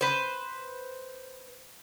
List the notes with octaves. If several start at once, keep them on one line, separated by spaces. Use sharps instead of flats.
B4 C5